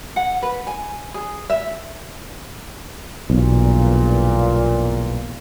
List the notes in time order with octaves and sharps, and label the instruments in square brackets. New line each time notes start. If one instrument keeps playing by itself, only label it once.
[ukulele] F#5
B4
G#5
G#4
E5
[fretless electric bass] B1 [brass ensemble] E2 G2 A#2